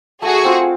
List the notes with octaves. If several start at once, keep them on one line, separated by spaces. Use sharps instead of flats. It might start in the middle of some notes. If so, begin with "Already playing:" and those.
A3 F#4 G#4
C4 F4